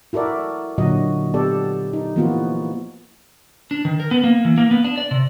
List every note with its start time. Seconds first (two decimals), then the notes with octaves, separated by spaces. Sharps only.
0.13 E4 F#4 A4 A#4 D5
0.78 A#2 D3 F#3 F#4 D#5
1.34 B3 G4 A4 D5
1.93 D#4
2.16 E3 F3 A#3 B3 F4 F#4
3.71 D4
3.85 D#3
4.00 A#4
4.11 B3
4.24 A#3
4.45 E3
4.58 A#3
4.71 B3
4.85 D4
4.98 D5
5.11 C3